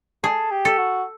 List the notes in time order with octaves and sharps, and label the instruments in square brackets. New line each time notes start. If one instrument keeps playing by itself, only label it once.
[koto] G#4 [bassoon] A4
[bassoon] G4
[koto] A4
[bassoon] F#4